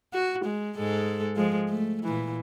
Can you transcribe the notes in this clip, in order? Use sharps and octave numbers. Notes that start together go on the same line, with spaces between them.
F#4
G#3
G#2 G#3 A4
F3 G#3
A3
A#2 E3